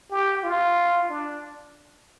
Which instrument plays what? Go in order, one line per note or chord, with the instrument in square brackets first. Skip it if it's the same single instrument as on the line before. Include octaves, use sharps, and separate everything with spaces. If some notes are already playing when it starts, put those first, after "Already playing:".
[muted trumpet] G4
F4
D4